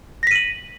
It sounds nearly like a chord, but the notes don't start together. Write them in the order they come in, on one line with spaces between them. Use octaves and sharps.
A#6 B6 D#7 F#7